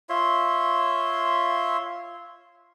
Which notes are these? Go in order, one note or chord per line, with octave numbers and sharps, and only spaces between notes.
F4 C#5 E5 C6